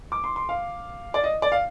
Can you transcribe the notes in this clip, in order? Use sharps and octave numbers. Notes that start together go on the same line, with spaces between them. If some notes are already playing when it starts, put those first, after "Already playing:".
D6
C6
C6
F5
D5
D#5
D5
F5